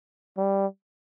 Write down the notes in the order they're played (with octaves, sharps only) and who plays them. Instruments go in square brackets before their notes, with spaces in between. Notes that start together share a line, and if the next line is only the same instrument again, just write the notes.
[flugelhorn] G3